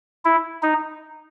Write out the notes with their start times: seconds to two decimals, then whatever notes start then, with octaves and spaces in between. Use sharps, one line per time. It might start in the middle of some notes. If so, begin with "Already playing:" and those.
0.25 E4
0.63 D#4